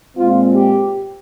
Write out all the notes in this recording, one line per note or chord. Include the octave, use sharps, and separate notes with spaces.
A#2 G#3 C4 F4
G4